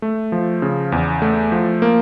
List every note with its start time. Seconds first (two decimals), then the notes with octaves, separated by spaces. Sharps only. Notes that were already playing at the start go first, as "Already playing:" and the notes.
0.02 A3
0.32 F3
0.62 C#3
0.92 E2
1.22 A3
1.52 F3
1.82 A#3